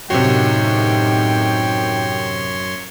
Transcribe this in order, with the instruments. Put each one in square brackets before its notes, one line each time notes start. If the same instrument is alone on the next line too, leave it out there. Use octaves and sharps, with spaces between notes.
[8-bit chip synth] F#2 C#5 C6 [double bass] A2 D#3 [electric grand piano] C3 F#4 [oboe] G5